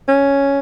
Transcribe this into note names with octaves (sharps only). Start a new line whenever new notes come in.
C#4